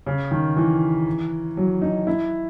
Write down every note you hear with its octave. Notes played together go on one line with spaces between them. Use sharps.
C#3
D#3
E3
F#3
D#4
E4